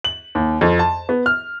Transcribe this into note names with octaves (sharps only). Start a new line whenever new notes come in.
F#7
D#2
F2
A5
B3
F6